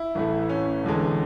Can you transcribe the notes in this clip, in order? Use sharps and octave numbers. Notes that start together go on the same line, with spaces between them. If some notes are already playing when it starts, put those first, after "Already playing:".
Already playing: E4
A1 A2 E3 A3
C#4
E1 E2 D3 G#3